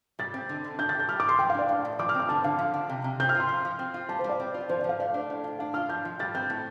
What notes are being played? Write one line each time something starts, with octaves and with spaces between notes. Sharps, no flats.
G3 A6
C4
D3
D3
D4 G6
A6
G4
G6
G3 F6
D6
G3 C6
F3 G5
F5
D4 D5
A2
A2
F3 D6
F6
C4 D6
D3 A5
D3 F5
F3
D4
C3
C3
C4 G6
F6
F4
C6
F3
F3
C4
F4
G3 A5
C5
G3
D5
C4
F4
F3 C5
D5
F3
F5
A3 D5
D4
A2
F4
D4 F5
F4 F6
F3 G6
F3
G3 A6
C4 G6
A2